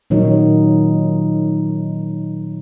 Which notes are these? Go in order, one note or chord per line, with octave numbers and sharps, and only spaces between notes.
A#2 D#3 F#3 D#4 C#5